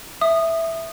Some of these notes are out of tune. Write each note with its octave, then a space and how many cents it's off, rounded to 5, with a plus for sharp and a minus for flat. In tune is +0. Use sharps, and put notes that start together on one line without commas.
E5 +0 D#6 -15